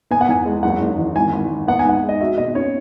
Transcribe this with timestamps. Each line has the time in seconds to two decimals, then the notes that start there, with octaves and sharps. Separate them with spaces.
0.11 B3 G#5
0.21 F#5
0.28 E2 G#5
0.46 G#3
0.63 F#1 F#5
0.80 F#1
0.98 E3
1.16 G#1 G#5
1.33 G#1
1.51 D#3
1.67 B3 F#5
1.79 G#5
1.85 G#2 F#5
2.03 G#3
2.09 D#5
2.21 F#4 E5
2.38 B2 D#5
2.55 C#4 C#5